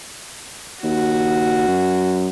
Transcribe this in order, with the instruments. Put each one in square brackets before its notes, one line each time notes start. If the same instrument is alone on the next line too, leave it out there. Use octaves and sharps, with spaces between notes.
[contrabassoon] D#2 [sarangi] F#4
[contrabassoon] F#2